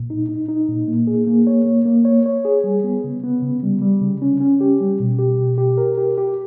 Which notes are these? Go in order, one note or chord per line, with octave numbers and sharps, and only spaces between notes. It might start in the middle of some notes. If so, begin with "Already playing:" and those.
Already playing: A#2
D#4
D#4
D#4
A#2
A#3
G#4
A#3
C#5
A#3
A#3
C#5
C#5
G#4
G3
B3
C#3
B3
C#3
G3
G3
C#3
C#4
C#4
G4
G3
B2
G4
B2
G4
A#4
G4
G4